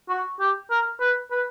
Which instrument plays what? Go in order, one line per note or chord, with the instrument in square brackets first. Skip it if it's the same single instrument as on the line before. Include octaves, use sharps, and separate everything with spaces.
[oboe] F#4
G4
A#4
B4
B4